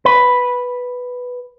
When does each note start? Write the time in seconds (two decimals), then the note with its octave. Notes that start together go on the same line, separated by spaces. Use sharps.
0.05 B4